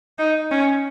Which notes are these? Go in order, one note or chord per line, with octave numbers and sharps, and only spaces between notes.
D#4
C#4